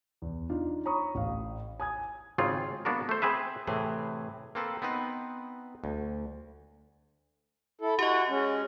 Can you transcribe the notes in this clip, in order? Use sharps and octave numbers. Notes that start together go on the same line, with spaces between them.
E2
D4 D#4 F4
C#5 A#5 B5 C#6 D#6
A1 F5
G#5 D#6 G#6
G#1 C#3 C4 F4 G#4
A#3 B3 D4 F#4 A#4
A3 C5
C4 G#4 B4 E5
A2 C3 E3 G#4
A#3 C4 A4 B4
B3 C4 D#4 B4
D2
E4 A4
F#4 G4 D#5 F#5
G#3 C#4